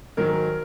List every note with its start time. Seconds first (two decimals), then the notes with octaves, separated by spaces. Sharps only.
0.17 G#2 D#3 F#3 A#4